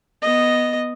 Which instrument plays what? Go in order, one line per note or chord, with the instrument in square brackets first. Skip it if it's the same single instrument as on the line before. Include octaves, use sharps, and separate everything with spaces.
[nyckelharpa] B3 D#5